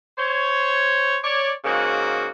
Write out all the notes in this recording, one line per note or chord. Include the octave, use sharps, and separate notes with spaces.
C5 C#5
C#5 D5
G#2 C#3 A#3 F#4